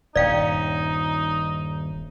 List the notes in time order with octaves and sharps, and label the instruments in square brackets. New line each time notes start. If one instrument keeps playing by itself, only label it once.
[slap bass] D#1 G2 [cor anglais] D#4 [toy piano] D5 F5 G5